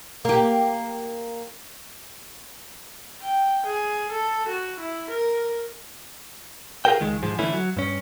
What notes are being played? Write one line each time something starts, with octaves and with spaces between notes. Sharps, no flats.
A#3 G4
G5
G#4
A4
F#4
E4
A#4
F4 G#4 A#4 C5 G5
C#2 D#3 G#3
G#2 F3 G#3
D3 E3 A3 C#4 E4
F#3
G2 C#4